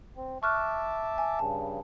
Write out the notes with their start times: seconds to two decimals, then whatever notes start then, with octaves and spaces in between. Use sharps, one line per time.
0.16 C4
0.43 E5 A5 C#6 D6 F6 F#6
1.18 G#5
1.39 G2 C#3 A5